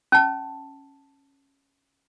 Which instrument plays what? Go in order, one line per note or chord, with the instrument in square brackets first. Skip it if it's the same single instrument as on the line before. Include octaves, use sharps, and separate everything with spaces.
[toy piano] C#4 A5